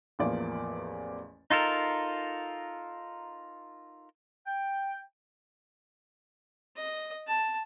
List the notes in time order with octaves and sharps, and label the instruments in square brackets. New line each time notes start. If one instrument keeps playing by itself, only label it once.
[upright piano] A1 E2 F3 A#3 D5
[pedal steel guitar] D#4 F4 A4 A#4
[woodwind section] G5
[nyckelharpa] D#5
A5